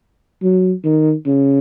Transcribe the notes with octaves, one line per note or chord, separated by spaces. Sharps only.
F#3
D#3
C#3